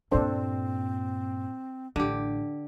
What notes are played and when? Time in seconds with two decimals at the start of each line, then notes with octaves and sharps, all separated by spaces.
0.12 G2 A#2 C4 D4 A4 C5
1.96 A1 D3 G4